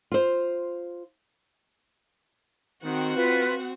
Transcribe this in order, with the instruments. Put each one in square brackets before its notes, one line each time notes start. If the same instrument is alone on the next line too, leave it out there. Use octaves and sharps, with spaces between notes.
[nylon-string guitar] F4 C5
[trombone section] D#3 [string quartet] C4 F#4 F#5
[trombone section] F4 [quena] B4